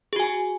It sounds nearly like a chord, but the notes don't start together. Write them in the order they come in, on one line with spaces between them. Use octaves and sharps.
G#4 F#4 G#5